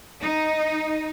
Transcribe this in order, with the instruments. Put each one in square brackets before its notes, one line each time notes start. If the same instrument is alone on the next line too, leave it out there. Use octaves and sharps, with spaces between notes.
[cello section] D#4